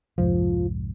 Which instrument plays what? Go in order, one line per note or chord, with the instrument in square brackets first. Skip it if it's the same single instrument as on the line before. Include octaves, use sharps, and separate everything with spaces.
[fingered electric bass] C2 F2 G#2 [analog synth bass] F3